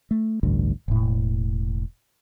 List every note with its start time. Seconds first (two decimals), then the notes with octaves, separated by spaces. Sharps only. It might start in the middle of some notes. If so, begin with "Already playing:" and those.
0.11 A3
0.43 A1 D2 G2
0.88 E1 A2